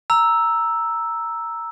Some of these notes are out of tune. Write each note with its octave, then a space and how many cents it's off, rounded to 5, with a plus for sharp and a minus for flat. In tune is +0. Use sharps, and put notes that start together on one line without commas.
A#5 +0 E6 +0